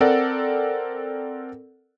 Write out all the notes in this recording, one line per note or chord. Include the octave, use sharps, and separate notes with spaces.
C4 A4 A#4 D5 F#5